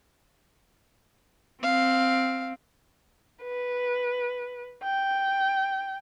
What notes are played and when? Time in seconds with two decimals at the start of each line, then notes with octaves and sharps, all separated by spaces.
1.63 C4 F5
3.43 B4
4.83 G5